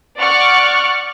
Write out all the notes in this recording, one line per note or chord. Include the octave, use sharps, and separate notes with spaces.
D5 F#5 C#6 D6 F6 F#6